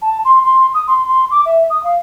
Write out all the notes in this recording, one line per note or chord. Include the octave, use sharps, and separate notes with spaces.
A5
C6
C6
D#6
C6
C6
D6
E5
D#6
F5